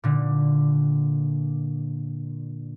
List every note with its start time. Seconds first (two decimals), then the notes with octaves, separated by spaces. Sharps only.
0.04 A#2 D3